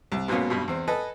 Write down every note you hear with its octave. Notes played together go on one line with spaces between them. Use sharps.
C2
G#2 B2 F#3 A#3 B3 C#4
G#1 G2 B2
E2 C4
A4 B4 D#5 G#5